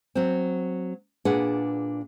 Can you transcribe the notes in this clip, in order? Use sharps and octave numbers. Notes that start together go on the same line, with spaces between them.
F#3 C4
A#2 D4 G#4 B4 F#5